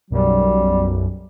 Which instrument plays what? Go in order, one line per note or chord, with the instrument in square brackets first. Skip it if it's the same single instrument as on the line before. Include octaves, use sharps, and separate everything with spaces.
[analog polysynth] B1 F#2 [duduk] G3